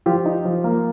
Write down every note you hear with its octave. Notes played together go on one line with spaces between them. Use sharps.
F3 F4 G4
D#4
F3
A#3